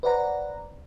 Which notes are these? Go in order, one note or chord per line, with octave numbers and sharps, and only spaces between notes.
B4 C5 D5 F#5 A#5